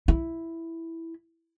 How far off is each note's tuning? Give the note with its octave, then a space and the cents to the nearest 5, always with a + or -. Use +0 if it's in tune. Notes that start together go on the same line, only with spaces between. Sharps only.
E4 +0